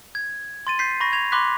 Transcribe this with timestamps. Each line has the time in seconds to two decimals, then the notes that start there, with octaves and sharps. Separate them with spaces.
0.15 G#6
0.67 C6 A6 D#7
0.79 G6 B6 C7
1.00 B5 C#6 A#6
1.13 G#6 F7
1.32 B5 C6 D6 F#6 B6